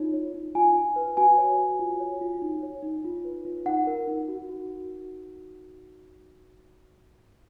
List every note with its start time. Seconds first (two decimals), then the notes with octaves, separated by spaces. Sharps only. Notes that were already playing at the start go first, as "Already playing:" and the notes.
Already playing: D#4 F4 C#5
0.13 C#5
0.34 D#4
0.55 F4 G#5
0.76 F4
0.96 B4
1.17 F#4 G#5
1.38 C#5
1.59 F#4
1.79 F4
2.00 C#5
2.21 F4
2.42 D#4
2.63 C#5
2.83 D#4
3.04 F4
3.25 B4
3.45 F4
3.65 D#4 F#5
3.87 A#4
4.08 D#4
4.29 F#4
4.49 F#4